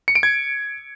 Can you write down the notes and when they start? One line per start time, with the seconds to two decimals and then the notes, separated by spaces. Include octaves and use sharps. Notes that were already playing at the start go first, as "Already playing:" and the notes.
0.08 C#7
0.15 D7
0.23 G#6